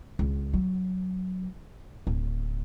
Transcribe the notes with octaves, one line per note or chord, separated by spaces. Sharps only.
C#2
F#3
D1